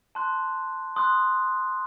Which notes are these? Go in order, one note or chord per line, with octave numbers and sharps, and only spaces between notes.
A5 C6 F#6
C6 D#6 F#6